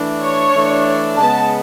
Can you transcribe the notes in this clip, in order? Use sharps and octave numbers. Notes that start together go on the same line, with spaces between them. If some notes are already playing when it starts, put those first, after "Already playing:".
Already playing: E3 A3 D4
C#5
E3 A3 D4
C#3 G#3 B3 A5